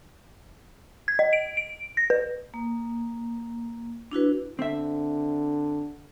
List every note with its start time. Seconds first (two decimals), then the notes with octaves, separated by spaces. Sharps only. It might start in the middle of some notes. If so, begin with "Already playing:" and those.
1.08 G#6
1.19 D#5
1.33 D7
1.57 D7
1.97 A#6
2.10 B4
2.54 A#3
4.12 D4 E4 F#4 B4
4.59 D3 C4 E5